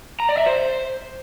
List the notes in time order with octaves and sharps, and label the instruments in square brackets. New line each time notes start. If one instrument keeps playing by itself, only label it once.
[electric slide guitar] A#5
D5
E5
C5